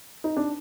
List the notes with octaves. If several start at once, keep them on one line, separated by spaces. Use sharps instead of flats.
D#4
D4